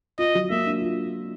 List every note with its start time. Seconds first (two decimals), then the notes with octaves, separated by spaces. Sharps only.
0.19 F4 D#5
0.35 F#3
0.50 A#3 E5
0.66 D4
0.82 F4